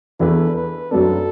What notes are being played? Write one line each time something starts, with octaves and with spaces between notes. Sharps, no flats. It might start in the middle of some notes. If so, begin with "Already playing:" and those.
E2 E3 D4 A4 B4
B4
F#2 F#3 A3 D4 A4